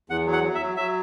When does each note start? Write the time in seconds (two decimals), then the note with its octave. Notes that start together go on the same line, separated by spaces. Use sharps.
0.10 E2 F#5
0.26 F#3
0.33 F#5
0.43 F#3
0.55 E5
0.61 F#3
0.77 F#3 E5